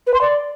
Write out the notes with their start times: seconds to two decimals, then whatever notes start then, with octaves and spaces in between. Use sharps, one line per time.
0.07 B4
0.14 C6
0.21 D5